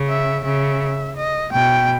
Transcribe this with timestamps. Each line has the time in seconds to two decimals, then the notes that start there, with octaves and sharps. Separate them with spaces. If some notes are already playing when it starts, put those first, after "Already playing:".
Already playing: C#3
0.09 E5
0.44 C#3 E5
1.16 D#5
1.52 B2 G5